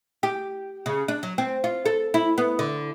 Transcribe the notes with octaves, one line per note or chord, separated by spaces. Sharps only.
G4
C#3
D4
F#3
C4
F4
A4
E4
B3
D3